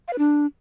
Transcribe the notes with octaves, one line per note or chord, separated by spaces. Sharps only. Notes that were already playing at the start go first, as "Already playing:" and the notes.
F5
B4
D4